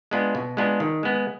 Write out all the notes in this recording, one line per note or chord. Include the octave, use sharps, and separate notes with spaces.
G#3 B3 D4 F4
B2
G#3 B3 D4 F4
D#3
G#3 B3